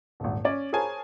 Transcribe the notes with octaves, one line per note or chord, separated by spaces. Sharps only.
D#1 G#1
C#4 D5
G#4 A#4 C5 C#5 G#5 A5